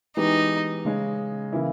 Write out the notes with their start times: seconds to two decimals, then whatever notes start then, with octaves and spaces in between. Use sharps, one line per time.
0.17 E3 G#3 B3 D#4 G4
0.85 C#3 G#3 C#4
1.53 C#3 E3 A#3 E4